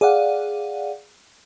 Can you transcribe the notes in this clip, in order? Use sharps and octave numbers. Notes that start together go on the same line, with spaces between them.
G#4 D5 F5 F#5